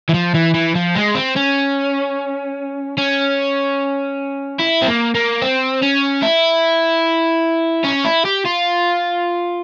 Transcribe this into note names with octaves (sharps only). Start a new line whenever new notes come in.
E3
F3
E3
E3
F3
G#3
C4
C#4
C#4
E4
C4
A#3
A#3
C4
C#4
E4
C#4
E4
G4
F4